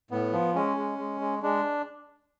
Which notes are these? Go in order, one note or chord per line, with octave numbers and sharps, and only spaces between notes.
A2 B3
F3
G#3 C#4
G#3
G#3
G#3
G#3 D4